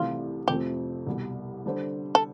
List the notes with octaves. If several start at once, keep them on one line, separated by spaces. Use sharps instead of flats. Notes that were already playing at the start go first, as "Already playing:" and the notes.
Already playing: C2 C3 E3 A3 F4
F2 C3 F3 A3 C4 G4
C2 B2 G3
D3 G3 D4 A4 C5
A4